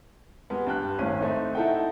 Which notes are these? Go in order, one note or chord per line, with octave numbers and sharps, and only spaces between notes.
G3 G#3 B3
G2 G5 F#6
G#1 A2 C#4 D#7
A3 C4 D#4
D#4 E4 A4 E5 F#5 G5